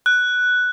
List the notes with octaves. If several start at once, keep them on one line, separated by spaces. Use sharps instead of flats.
F#6